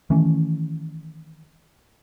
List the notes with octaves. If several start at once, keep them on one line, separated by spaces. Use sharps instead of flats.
D#3 E3 A3 C#4